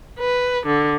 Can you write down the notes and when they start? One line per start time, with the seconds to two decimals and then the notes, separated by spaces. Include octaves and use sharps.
0.19 B4
0.66 D3